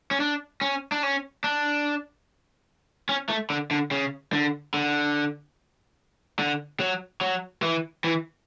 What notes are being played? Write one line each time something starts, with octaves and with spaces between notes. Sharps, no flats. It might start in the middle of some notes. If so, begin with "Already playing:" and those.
C#4
D4
C#4
D4
C#4
D4
C#4
A3
D3
D3
C#3
D3
D3
D3
F#3
F#3
E3
E3